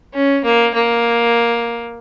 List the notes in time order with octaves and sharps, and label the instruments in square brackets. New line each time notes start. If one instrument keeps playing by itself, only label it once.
[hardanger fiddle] C#4
A#3
A#3